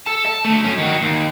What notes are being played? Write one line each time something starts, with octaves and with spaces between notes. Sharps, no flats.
A4 A5
A5
D3 A3
F#2 C#4
D#3 F#4
D#2